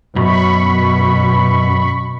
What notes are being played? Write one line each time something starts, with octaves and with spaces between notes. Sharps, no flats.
F#2 B2 B5 C#6